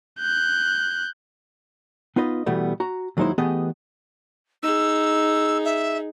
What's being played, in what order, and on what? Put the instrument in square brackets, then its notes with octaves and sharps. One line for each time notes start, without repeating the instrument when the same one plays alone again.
[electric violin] F#6 G6
[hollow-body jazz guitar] B3 D#4 F4 B4 D#5
B2 E3 G3 A3 B3
F#4 A#5
D#2 F#3 G#3 D#4 E4 C5
E3 A3 B3 G4 G#4 D#5
[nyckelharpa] D#4 G#4 [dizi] E6
[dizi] E5